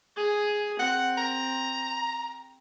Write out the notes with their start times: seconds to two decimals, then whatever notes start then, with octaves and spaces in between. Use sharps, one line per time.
0.16 G#4
0.79 C4 F#5
1.18 A#5